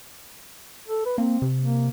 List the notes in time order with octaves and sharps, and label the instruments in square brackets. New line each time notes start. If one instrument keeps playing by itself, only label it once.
[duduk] A4
B4
[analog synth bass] A#3 [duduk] C4
[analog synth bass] C3
[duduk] A#3